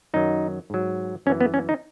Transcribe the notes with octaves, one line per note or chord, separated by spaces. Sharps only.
F#2 D#3 F#3 D#4
G#2 F#3
F#2 E3 C#4
B3
C#4
D#4